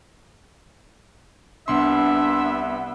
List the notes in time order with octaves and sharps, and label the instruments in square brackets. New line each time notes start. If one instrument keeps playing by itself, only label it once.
[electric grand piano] C2 C6 [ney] B3 [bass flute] D4 [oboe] E5